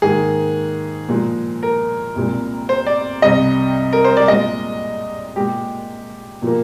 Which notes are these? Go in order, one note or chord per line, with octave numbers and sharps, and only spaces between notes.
G#2 D#3 A#3 G#4
A#2 F3 G#3
A#4
C2 A#2 G#3
C5
D5
C2 C3 G3 D#5
A#4
C5
D5
A#2 G#3 D#5
A#2 G#3 G4
A#2 F3 A#3